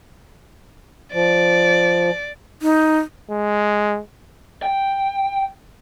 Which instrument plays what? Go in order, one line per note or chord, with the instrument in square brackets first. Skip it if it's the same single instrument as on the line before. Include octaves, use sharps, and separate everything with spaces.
[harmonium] F3 [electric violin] D5
[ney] D#4
[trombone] G#3
[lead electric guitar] G5